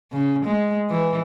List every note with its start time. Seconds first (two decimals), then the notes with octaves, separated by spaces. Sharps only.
0.12 C#3
0.45 G#3
0.90 E3